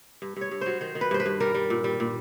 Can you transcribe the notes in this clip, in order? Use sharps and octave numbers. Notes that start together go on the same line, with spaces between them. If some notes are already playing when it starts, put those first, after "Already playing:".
G2
G2 C#5
G2
F#3 C5
D#3 C5
D#3
B4
G2 C5
B4
G2
G3 A#4
G3
A#2
G3
A#2